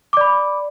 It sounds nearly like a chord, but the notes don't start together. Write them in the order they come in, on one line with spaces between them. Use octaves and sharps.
D6 D5 B5